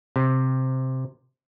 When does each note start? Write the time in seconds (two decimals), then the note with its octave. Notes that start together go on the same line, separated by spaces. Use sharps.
0.16 C3